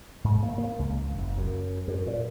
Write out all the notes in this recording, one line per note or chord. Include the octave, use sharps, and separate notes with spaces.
G#2
A#3
A#3
C#2
F#1
F#2
F#2
A#2